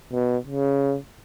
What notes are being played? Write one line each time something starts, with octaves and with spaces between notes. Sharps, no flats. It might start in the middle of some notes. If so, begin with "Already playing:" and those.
B2
C#3